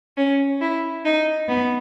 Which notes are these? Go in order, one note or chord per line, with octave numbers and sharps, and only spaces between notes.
C#4
E4
D#4
B3